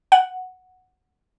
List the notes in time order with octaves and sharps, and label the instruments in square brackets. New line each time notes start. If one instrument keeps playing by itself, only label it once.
[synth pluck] F#5